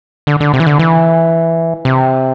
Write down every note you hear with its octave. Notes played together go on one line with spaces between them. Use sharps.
D3
D3
C3
E3
D3
E3
C3